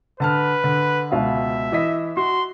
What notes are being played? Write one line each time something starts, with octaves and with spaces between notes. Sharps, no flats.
D3 B4 A5 F6
D3
C#2 B2 E5 F5
E3 D#5 B6
F#4 C6